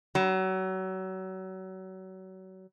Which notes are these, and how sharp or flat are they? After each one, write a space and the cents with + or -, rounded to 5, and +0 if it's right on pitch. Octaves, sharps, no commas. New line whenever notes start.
F#3 +30